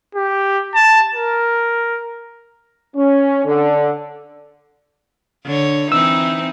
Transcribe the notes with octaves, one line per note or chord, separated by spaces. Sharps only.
G4
A5
A#4
C#4
D3
D3 C#5
E3 C4 D#4 E6